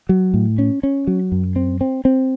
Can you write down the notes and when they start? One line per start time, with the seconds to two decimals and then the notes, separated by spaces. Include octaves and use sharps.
0.09 F#3
0.34 A2
0.59 C#4
0.83 C#4
1.07 F#3
1.32 F#2
1.56 C4
1.81 C4
2.05 C4